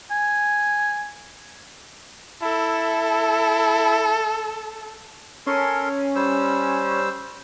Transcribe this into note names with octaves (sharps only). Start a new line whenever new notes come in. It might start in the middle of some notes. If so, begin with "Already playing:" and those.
G#5
E4 A4
C#4 A4 A#4 C6
G3 C5 E6